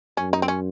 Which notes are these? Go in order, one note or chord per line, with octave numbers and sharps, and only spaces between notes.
F#2 C#4
D#4
C4
C#4